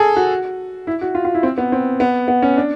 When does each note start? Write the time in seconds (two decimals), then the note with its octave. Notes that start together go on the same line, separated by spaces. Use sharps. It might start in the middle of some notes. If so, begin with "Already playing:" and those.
Already playing: G#4 A4
0.16 F#4
0.87 E4
1.01 F#4
1.15 F4
1.25 F4
1.34 E4
1.43 C4
1.58 B3
1.72 C4
2.00 B3
2.28 B3
2.42 C#4
2.57 D4